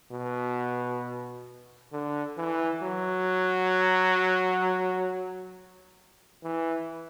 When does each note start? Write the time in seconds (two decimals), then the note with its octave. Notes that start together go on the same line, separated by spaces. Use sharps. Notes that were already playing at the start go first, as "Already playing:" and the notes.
0.12 B2
1.92 D3
2.37 E3
2.82 F#3
6.44 E3